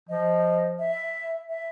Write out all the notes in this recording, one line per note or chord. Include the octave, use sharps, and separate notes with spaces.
F3 D#5
E5
E5